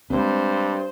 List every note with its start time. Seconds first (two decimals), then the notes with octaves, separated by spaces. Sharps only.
0.10 G2 G#3 C4 C5